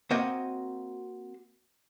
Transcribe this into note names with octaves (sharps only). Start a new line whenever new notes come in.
A#3 C4 F#4 C5 D#5 F5